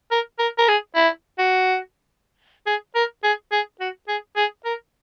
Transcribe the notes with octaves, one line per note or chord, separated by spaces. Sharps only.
A#4
A#4
A#4
G#4
E4
F#4
G#4
A#4
G#4
G#4
F#4
G#4
G#4
A#4